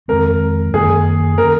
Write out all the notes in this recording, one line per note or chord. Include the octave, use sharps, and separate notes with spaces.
F2 D#3 G#3 C4 A#4
F#2 D#3 A#3 G#4
D#3 A#3 C#4 A#4